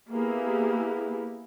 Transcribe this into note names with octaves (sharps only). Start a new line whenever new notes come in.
A#3 B3 E4 G4 G#4